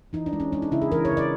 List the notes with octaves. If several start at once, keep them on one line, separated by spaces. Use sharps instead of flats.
E3 D#4
D4
G#3
C#4
G#3 D4
D#4
C#3 E4
G#4
E3 A#4
C#5
C#3
D5